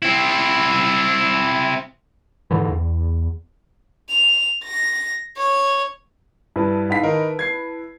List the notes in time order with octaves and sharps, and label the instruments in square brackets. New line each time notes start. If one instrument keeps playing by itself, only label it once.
[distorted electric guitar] C4 E4
[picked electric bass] G#2 D3 E3
E2
[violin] F7
A#6
C#5
[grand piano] G2 [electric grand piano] E4 B4 A5
[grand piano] G#2 F5 B6
D#3 D#4 A#4
G#6 C7